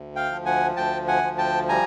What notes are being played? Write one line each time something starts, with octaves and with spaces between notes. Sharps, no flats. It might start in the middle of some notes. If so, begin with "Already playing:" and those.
Already playing: D2
F5 G5
F3
F#5 G#5
D2 G5 A5
F#5 G#5
F3
G5 A5
G3 G#5 A#5